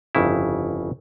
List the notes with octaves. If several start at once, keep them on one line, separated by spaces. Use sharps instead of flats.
G1 F2 C#3 E4